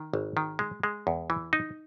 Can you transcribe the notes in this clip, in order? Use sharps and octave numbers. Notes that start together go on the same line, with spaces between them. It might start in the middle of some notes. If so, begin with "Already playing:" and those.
Already playing: D#3
G#1
D#3
G#3
G#3
E2
E3
D#4